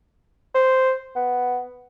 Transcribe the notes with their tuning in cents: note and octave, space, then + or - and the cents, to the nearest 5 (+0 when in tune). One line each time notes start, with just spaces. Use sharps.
C5 -5
B3 +5